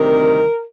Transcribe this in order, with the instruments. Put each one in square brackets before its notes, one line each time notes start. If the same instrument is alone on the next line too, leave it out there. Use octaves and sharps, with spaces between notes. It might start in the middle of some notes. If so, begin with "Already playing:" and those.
Already playing: [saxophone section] D2 C3 D#3 G3 C4 A#4